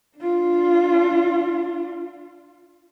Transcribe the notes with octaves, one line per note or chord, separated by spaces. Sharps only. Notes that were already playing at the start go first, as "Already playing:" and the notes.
D4 F4